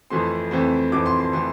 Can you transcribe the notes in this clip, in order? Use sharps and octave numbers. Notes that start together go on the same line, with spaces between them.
F2 E3 A3 C4 C6
F2 E3 A3 C4
F2 E3 A3 C4 D6
C6
C6
E3 A3 C4 C6